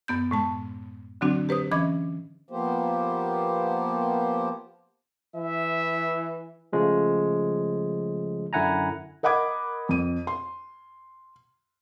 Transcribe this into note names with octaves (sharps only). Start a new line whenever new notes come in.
F#2 B3 G6
A2 G#3 A5
D3 F#3 C4 D4 F#4
G4 B4 C5 D#6
E3 C#4 D#5 B5 D6 G#6
F3 A#3 B3 G4 C5
E3 E5
C#3 F3 G#3 A3
F#2 D3 E4 F#5 G#5 A#5
A#4 D#5 F#5 B5 D6 G#6
F2 D#7
C6